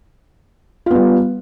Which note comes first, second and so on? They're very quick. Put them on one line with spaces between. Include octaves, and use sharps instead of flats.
F4 B3 G3